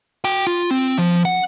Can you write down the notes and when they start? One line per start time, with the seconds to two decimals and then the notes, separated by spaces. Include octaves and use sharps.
0.25 F#4 G5
0.47 F4
0.71 C4
0.98 F3
1.25 F#5